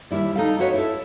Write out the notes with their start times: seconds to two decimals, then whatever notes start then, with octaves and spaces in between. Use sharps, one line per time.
0.11 D#2 G3 E4 D5
0.36 D#4 A4 F5
0.59 C#4 D#4 F#4 B4 C#5
0.74 E4 A4